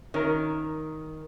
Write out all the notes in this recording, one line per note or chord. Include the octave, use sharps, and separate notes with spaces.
D#3 C#4 A#4